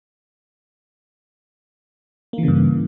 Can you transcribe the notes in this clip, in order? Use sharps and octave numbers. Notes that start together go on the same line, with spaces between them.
G2 C#3 E3 A#3